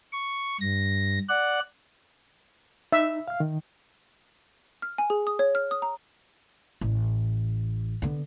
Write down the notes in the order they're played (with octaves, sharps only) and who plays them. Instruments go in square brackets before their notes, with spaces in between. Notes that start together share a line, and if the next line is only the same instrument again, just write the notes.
[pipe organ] C#6
G2 A#6
D5 F#5 F#6
[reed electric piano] D#4 [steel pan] E5
[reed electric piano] F5 F6
D#3
[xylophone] F6
G#5
G#4
D#6
C#5
F6
D#6
A#5
[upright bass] A1
D3 B3